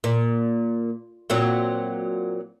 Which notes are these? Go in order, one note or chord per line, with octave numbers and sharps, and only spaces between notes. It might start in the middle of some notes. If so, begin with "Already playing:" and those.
A#2
A#2 F#3 C4